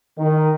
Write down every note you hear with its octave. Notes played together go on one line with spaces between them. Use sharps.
D#3